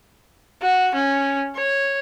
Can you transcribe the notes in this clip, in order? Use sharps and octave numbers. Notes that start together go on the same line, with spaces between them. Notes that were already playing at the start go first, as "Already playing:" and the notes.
F#4
C#4
C#5